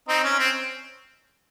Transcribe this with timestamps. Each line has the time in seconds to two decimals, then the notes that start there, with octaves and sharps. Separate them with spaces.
0.08 C4 D#4
0.23 C#4
0.39 C4